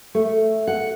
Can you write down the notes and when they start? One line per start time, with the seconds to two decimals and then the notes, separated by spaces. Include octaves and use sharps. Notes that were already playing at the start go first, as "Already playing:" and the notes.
0.15 A3
0.67 F#5